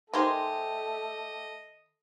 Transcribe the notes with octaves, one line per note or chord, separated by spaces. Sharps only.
D#3 A3 D#4 G4 C5 D#5 G#5 C6